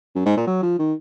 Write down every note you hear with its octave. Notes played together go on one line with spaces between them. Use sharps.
F#2
G#2
A#2
F#3
F3
D#3